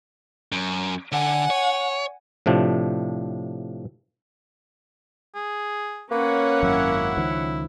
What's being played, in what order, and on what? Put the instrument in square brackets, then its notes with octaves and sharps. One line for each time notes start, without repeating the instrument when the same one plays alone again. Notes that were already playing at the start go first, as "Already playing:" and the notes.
[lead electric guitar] F#2
[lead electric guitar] D3 [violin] F#5 G#5
[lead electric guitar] C#5
[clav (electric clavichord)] A2 C3 F3 D4
[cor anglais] G#4
[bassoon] A#3 [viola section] C#4 C#5 F#5 [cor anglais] B4
[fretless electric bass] G#1 F#2 F#3 [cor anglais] E4
[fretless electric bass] C#2 D#3 F3